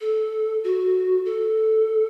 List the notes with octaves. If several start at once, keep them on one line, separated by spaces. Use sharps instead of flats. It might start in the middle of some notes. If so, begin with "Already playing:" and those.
A4
F#4
A4